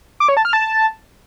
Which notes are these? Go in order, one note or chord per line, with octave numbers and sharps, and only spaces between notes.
D6
C#5
A5
F6
A5